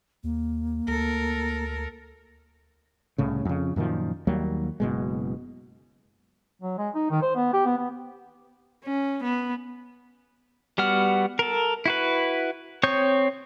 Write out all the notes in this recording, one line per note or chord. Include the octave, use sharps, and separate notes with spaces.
D#2 A#3
D2 A4 A#4
C2 A2 C#3
F2 C#3
F#2 A#2 D#3 F3
D#2 F#3 G3 A#3
F#1 B2 G#3
F#3
G#3
D#4
D#3
C5
B3
G4
B3
B3
C#4
B3
G3 B3 F#4 F#5 F6
A4 A#4
E4 F#4 B4
C4 C#5 C#6 D#6 G6